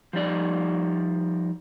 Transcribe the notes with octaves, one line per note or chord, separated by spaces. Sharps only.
F3 G3 D#4 D5